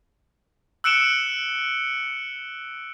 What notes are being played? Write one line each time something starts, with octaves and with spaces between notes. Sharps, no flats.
E6 F#6 C#7 D7 E7 G7